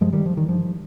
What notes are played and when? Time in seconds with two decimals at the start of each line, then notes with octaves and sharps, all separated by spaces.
0.01 G2 F3 G#3
0.13 D#3 G3
0.26 F3
0.37 D#3
0.49 G2 F3